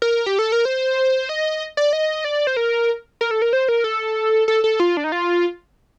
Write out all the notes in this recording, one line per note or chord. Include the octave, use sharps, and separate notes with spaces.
A#4
G4
A4
A#4
C5
D#5
D5
D#5
D5
C5
A#4
A#4
A4
A#4
C5
A#4
A4
A4
A4
F4
D4
D#4
F4